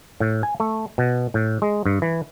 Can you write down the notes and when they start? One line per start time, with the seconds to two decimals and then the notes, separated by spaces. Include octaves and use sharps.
0.20 A2
0.43 G#5
0.60 A3
0.98 B2
1.34 A2
1.62 G#3
1.86 G2
2.02 E3